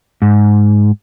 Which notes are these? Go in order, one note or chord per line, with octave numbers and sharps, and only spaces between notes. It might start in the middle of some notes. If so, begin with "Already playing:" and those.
G#2